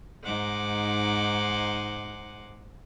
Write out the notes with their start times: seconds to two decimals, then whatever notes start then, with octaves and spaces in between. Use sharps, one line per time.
0.24 G#2 D#4 C5 F#5 G#5 D6